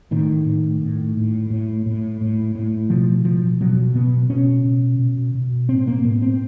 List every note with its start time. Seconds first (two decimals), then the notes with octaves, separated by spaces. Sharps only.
0.11 A2 D#3
0.46 A2
0.81 A2
1.16 A2
1.50 A2
1.86 A2
2.21 A2
2.55 A2
2.90 B2 F3
3.25 B2 F3
3.60 B2 F#3
3.95 B2 B3
4.30 B2 C#4
4.64 B2
4.99 B2
5.35 B2
5.69 A2 C4
5.87 A#3
6.04 A2 B3
6.22 C4